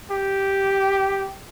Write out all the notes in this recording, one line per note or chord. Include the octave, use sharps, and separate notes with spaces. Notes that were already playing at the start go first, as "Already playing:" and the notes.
G4